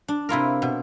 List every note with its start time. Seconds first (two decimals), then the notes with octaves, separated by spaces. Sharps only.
0.08 D4
0.29 C3 E4 F4 A#4
0.62 B2